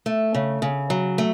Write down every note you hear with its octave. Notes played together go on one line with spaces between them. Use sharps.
A3
C#3
C#3
F#3
A3